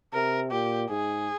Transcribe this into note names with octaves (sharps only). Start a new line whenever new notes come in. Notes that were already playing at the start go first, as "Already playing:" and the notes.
C3 A#4
A#2 G4
G#2 G#4